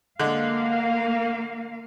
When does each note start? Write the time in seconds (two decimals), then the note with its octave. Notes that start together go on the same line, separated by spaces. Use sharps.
0.20 D3 G#3 A#3 F5